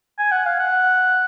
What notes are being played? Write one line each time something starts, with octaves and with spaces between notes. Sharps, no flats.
G#5
F#5
F5
F#5